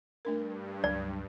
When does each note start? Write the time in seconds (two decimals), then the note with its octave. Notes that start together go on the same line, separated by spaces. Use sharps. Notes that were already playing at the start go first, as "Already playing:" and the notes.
0.25 G2 A3 D4 A#4
0.84 C#2 F#3 D5